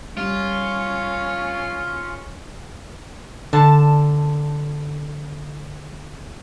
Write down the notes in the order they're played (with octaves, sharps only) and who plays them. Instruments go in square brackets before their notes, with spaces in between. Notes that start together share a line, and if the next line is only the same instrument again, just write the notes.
[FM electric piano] G3 [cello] C#4 [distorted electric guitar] F4
[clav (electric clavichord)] D3 [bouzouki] A5